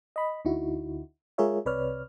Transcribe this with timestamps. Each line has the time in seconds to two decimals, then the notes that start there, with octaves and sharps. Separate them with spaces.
0.16 D#5 B5
0.45 D2 D3 D#4 E4 F#4
1.38 G#3 F4 G#4 A#4 C#5 E5
1.66 C2 C3 B4 C#5 D5 F6